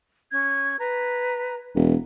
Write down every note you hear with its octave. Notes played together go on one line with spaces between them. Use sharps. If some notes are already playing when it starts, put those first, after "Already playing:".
C#4 G#6
B4 A#5
E1